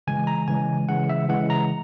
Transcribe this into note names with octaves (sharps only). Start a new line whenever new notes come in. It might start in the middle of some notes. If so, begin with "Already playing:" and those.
C#3 E3 G#3 G#5
A#5
C#3 E3 G#3 G#5
C#3 E3 G#3 F#5
E5
C#3 E3 G#3 F#5
A#5